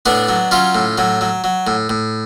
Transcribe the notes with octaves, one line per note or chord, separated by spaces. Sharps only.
A2 B3 D4
F#3
F#3 C#4 F4
A2
A2 F#3
F#3
F#3
A2
A2